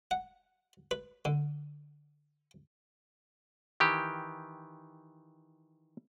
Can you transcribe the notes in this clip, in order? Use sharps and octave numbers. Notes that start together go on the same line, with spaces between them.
F#5
B4
D3
D#3 E3 G4